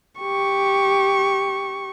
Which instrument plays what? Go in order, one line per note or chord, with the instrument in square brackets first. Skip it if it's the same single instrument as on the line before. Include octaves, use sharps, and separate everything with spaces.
[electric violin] G4 C#6